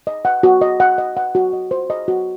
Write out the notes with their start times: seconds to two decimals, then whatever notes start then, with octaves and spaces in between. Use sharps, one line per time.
0.07 D#5
0.25 F#5
0.43 F#4
0.61 D#5
0.80 F#5
0.98 D#5
1.17 F#5
1.35 F#4
1.53 D#5
1.71 C5
1.90 D#5
2.08 F#4